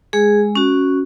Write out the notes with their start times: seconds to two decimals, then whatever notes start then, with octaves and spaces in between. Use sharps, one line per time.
0.13 G#3 G#4
0.55 C#4 F#4